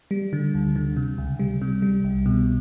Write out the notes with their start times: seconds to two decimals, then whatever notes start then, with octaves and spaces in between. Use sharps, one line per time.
0.11 G3
0.33 D3
0.55 D2
0.76 D3
0.97 C3
1.18 C#2
1.39 G3
1.62 C3
1.82 G3
2.04 C2
2.26 B2